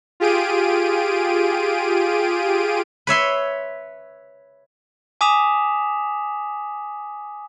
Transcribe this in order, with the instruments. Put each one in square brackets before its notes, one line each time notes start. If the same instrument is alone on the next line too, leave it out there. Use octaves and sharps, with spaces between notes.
[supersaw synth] F4 G4 G#4 D7 D#7
[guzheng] B4 C#5 E5 C6
[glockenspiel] G#5 D6 D#6 B6 E7 F7